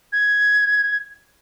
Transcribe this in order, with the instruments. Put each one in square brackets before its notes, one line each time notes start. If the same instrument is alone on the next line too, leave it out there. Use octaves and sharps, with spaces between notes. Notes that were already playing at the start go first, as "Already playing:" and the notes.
[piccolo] G#6